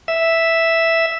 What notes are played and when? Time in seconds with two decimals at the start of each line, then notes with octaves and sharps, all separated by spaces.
0.08 E5